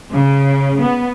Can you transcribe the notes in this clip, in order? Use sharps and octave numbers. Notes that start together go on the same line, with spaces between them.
C#3
B3